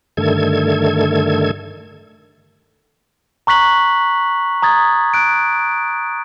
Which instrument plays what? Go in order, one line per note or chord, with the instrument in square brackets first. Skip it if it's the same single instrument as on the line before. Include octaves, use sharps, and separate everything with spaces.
[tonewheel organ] G2 D3 D#3 A3 A4 G#6
[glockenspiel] A#5 C#6 F#6 B6 F#7
A#5 D#6 G#6 A6
F#6 D7